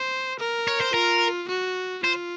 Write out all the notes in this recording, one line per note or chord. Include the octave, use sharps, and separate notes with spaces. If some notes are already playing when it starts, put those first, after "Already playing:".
Already playing: C5
A#4
C#5
C5
F4 A#4
F#4
F4 C5